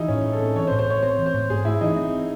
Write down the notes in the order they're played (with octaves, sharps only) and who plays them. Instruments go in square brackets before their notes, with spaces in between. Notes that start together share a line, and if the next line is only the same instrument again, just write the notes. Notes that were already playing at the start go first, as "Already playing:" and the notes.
Already playing: [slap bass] E3 [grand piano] D#4 E4 G#4
[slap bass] A2 [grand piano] C#4
[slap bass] A2
[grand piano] A4
[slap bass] C4
[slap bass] E3 [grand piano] C#5
[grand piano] C5
[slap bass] A2
[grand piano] C5
[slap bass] A2 [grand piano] C#5
[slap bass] C4 [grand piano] C5
[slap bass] E3
[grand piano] C5
[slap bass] A2
[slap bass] G#2 [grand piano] G#4
[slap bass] A3 [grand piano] E4
[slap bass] E3 [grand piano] D#4
[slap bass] C4